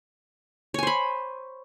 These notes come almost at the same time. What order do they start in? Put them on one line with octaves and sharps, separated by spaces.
C#5 G#5 C5 B5